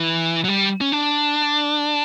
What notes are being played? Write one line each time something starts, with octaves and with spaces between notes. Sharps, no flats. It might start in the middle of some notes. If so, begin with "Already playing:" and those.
Already playing: E3
F#3
G3
C#4
D4